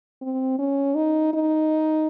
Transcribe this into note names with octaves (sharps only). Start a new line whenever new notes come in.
C4
C#4
D#4
D#4